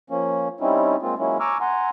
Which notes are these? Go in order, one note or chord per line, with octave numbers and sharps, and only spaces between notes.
F3 A#3 C#4
G3 C4 C#4 D#4 E4
G#3 A#3 C4 F4
F#3 G#3 A#3 C#4 E4
G#5 A#5 C#6 D6 E6 F6
F#5 G#5 A#5 C6